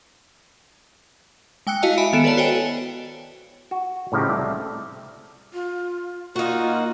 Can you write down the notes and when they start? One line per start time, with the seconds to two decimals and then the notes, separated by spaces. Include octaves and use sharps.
1.67 G#3 G5 E6 F#6 C#7
1.82 E4 F#4 D#5 F5 A5
1.98 E5 G#5 B5 D7
2.13 D#3 B3 A4 C#7 D7 E7
2.24 A4 B4 C#5 D5 F5 A5
2.37 F#4 C5 C#5 D#5 G5 G#5
3.71 F#4
4.12 A2 C#3 F3 D#4 G4
4.28 C2 A3 D5
5.53 F4
6.36 A#3 D#4 F4 F#4